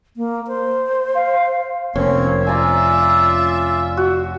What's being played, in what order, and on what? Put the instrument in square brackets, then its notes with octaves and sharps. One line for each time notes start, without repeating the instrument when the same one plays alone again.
[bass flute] A#3
C5
[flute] F5
[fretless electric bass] F1 [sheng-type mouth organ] A#3 C4 C#5 [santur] C#4
[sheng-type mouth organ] F4 D5 [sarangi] E5 [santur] G#5 A#5
[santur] F#4